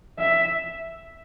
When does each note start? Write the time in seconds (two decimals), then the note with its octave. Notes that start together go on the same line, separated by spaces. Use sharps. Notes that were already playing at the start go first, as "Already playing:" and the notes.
0.19 E5